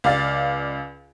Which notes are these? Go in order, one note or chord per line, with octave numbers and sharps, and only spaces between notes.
C#2 D5 F5 A6